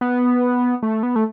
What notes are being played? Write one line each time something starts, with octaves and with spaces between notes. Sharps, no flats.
B3
A3
B3
A3